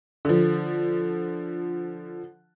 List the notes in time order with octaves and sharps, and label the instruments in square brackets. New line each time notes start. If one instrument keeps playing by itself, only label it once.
[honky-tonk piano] D3 F3